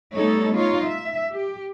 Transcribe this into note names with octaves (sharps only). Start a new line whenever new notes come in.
G3 A3 B3 D#4 A4 C#5
D#4 F4 C#5
E5
G4